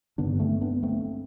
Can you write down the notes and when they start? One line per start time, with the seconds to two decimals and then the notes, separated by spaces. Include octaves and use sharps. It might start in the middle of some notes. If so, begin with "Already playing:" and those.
0.18 G2 D3 B3 D4
0.40 A3 C4
0.61 B3 D4
0.83 A3 C4